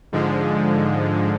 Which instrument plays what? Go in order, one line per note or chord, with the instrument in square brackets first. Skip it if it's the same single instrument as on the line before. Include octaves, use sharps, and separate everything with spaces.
[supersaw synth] G#2 D3 F3 G#3